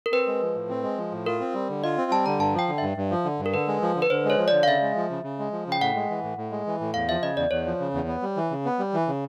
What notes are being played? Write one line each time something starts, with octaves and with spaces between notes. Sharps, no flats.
A#4
C4 B4
G#3
F3
A2
C4
G#3
F3
A2
F4 A#4
C4
G3
D3
F4 D#5
C4
G3 A5
D3 A#5
G2 A5
F3 G5
D3
G2 E5
G2
F3
D3
G2
A#4
D3 B4
G#3
F3
D3
B4
D3 C5
G#3 C#5
F3
D3 D5
F5
C#3 E5
G#3
F3
C#3
C#3
G#3
F3
C#3
G5
A2 F#5
G#3
E3
A2
A2
G#3
E3
A2
E2 F5
F3 E5
C#3 D#5
E2 D5
E2 C#5
F3
C#3
E2
B3
G3
E3
C#3
B3
G3
E3
C#3